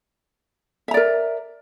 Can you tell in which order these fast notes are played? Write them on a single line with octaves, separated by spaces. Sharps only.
E5 A#5 D5 A#4